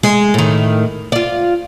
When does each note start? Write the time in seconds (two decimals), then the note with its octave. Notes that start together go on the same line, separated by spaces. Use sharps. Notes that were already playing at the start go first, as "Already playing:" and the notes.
0.03 G#3
0.34 A2 D#3
1.12 F4 D5